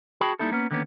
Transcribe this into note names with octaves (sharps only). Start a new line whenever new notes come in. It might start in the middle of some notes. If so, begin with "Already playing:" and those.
F#4 G#4 G5 A5 B5
G3 A#3 D#4 E4 A4
A#3 B3 C#4
D3 D#3 A#3 B3 C#4